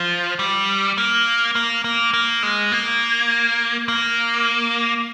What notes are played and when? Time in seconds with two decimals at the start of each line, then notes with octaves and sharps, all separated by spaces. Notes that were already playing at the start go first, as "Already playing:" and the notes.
Already playing: F3
0.39 G3
0.98 A#3
1.55 A#3
1.84 A#3
2.14 A#3
2.43 G#3
2.72 A#3
3.88 A#3